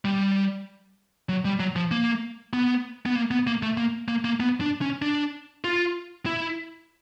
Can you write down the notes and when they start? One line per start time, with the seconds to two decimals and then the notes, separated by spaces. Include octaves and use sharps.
0.05 G3
1.29 F#3
1.45 G3
1.60 F#3
1.76 F3
1.91 A#3
2.53 B3
3.06 B3
3.15 A#3
3.31 B3
3.47 A#3
3.63 A3
3.77 A#3
4.08 A#3
4.25 A#3
4.40 B3
4.61 D4
4.81 C#4
5.02 D4
5.64 F4
6.26 E4